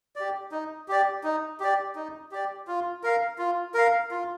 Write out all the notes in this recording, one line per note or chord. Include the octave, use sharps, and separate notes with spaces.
G4 D5
D#4
G4 D5
D#4
G4 D5
D#4
G4 D5
F4
A#4 F5
F4
A#4 F5
F4